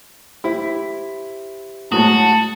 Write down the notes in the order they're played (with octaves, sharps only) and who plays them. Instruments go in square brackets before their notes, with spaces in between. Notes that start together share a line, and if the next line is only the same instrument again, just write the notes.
[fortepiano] E4 [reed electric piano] G4 C5 E5
[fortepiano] A2 F#3 G#3 [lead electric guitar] F#4 [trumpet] A5 [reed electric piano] D#6